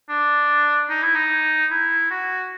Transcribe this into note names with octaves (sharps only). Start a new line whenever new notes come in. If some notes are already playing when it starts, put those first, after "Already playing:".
D4
D#4
E4
D#4
E4
F#4